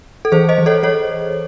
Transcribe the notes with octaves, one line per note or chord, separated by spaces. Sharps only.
A4
E3 G#4 C5
C5 D#5
E3
A4 C#5
E3 A4 C#5